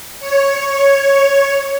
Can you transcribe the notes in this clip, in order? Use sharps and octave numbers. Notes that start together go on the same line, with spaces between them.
C#5
C#5